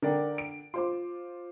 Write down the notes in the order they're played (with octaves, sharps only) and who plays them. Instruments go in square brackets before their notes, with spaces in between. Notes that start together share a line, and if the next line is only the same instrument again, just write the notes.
[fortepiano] D3 [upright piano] A#4 D5 G5
[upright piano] D7
[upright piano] F4 C5 D6 [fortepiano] C6